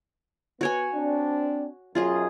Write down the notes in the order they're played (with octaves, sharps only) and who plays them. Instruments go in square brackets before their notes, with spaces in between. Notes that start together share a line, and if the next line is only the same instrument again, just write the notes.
[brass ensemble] B3 [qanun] F#4 C#5 G#5
[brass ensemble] C4 D4
[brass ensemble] B1 F#2 [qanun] F4 G#4 D#5